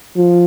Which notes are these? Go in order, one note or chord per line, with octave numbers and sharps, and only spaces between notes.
F3